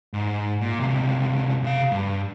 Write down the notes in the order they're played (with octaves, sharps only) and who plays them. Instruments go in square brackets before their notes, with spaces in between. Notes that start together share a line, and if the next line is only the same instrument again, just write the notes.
[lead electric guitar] G#2
A#2
C#2 C3
C3 F5
G2